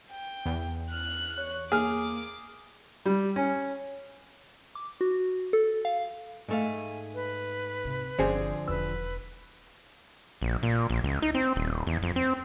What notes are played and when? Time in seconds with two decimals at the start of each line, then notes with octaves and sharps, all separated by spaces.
0.12 G5
0.45 E2
0.91 F6 F#6
1.38 C#5
1.72 A#3 G#4 D6 F6
3.06 G3
3.36 C#4
4.75 D6
5.01 F#4
5.53 A4
5.85 F5
6.49 G#2 A3 F5 G#5
7.14 B4
7.85 C3
8.19 G1 D3 F3 C4 G#4
8.68 E1 E2 B4 E6
10.41 A#1
10.63 A#2
10.90 A#1
11.04 C#2
11.22 D#4
11.35 C4
11.56 D#1
11.87 E2
12.03 F2
12.16 C4